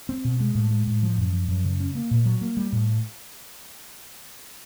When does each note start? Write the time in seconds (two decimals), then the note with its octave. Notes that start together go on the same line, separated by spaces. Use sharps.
0.09 C4
0.25 B2
0.40 G#3
0.55 A2
0.71 G#3
0.87 A2
1.03 F3
1.18 F#2
1.33 F3
1.48 F#2
1.64 C#3
1.80 C#4
1.95 A#3
2.11 A#2
2.26 F#3
2.41 A#3
2.57 G3
2.72 A2